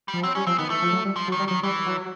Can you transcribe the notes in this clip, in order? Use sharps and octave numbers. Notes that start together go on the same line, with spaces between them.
G3
F3
F#3 C4
G3 C#4
F3 C4
D#3 B3
E3 A3
F3
F#3
G3
F3
F#3
D#3
G3
D#3 F#3
E3 G3
F#3